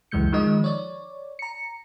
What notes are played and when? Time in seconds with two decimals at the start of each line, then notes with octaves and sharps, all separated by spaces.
0.11 C#2 F#2 E3 G#3 G6 C#7
0.32 D#3 F3 G#3 D#4 D#5
0.64 C#5 D5
1.39 A#5 C#7